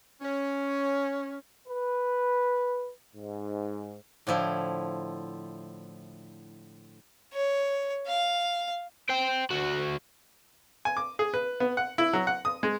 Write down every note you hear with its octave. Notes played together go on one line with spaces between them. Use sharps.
C#4
B4
G#2
A2 D3 F3 E4
C#5
F5
C5 G5
D2 F#4
G#5
D6
G#4
B4
B3
F#5
E4
F#3
F#5
D#6
G#3